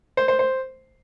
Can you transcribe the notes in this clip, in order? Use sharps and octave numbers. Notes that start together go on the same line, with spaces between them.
C5
C5
C5